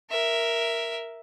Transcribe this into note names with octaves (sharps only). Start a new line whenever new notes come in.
A#4 E5